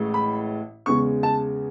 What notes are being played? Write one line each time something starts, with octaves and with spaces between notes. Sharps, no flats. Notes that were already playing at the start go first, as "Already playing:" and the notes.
Already playing: A1 A2 G#3
B5
E2 C#3 G#3 C#6
A5